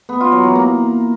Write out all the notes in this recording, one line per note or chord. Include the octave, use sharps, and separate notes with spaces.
B3
F4
F#3
E3
A#3